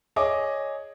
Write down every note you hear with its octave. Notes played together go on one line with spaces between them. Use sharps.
G#4 C#5 D#5 D6